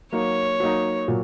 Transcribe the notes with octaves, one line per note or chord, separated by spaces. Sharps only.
F#3 A#3 D#4 C#5
F#3 A#3 D#4
A#2 F#3